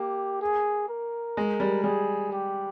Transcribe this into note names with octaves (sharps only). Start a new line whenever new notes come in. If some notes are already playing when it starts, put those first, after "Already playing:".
Already playing: A#3 G4
G#4
A#4
G#3
G3
G3 G#4
G4